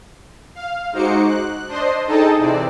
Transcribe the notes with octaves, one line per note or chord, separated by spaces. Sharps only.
F5
G#3 D#4 F#4 C5 D6 C#7
F#6
D4 C5 D#5 C6
D#4 G#4 A4 D#5 G5 A5
C3 E3 C4 D5